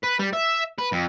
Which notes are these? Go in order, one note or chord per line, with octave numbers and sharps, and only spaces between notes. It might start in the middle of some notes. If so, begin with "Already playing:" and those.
B4
G3
E5
B4
F2